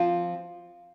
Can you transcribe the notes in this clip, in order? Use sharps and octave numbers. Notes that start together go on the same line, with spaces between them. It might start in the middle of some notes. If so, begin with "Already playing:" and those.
Already playing: F3 C4 F4